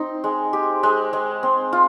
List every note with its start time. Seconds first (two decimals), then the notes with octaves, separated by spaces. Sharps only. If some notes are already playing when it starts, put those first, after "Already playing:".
Already playing: C4 D#4
0.24 G#3
0.53 G4
0.83 G#3
1.13 G#3
1.43 C4
1.73 F4